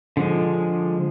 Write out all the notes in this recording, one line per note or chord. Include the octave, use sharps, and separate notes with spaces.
D3 F3 G#3